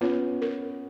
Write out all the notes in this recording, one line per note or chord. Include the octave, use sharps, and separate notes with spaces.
B3 C#4 F4
A#4